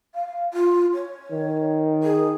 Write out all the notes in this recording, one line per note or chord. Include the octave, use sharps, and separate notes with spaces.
F5
F4
C#5
D#3
G#4